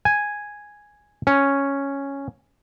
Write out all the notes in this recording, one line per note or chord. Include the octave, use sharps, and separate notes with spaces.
G#5
C#4